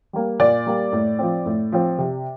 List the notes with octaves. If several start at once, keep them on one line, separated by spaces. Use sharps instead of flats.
G3 A#3
A#2 D5
G3 A#3
A2
F3 C4
A2
F3 C4
C3